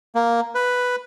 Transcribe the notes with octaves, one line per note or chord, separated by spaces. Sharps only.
A#3
B4